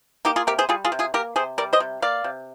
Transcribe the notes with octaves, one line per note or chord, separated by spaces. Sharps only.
A#3 D#4 G4
F4 G#4
C3 G4 A#4
G#4 C5
G3 F4 G#4
F4 G#4
C3
F4 G#4
A#3 G4 A#4
C3 G#4 C5
G3 A#4 D5
C5 D#5
C3
A#3 D5 F5
C3